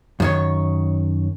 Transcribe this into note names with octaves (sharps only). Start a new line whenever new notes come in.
F#2 D#3 C#5